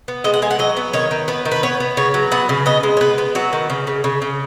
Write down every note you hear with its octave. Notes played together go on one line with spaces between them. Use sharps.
B3
G#3 D#5
F#5
G#3 G#5
F#5
F#3 D#5
B3
D#3 C#5
D#3
B3 B4
D#3
B4
B3 C#5
B3
C#3 C#5
F#3
B3 F#5
C#3
B3 D#5
G#3
C#5
B3 B4
B3
F#3 F#4
D#3
C#3
C#3
C#3
C#3